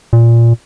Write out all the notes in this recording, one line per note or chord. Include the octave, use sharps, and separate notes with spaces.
A#2